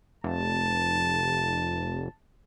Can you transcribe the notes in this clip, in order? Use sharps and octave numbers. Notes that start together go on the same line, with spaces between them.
F1 A5